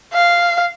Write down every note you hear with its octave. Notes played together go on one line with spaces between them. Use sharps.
F5